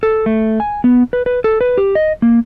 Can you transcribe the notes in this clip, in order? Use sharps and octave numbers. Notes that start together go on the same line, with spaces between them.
A4
A3
G#5
B3
B4
B4
A4
B4
G4
D#5
A#3